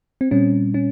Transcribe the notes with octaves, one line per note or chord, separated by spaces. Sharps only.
C4
A#2 G3 C4 C#4
C#4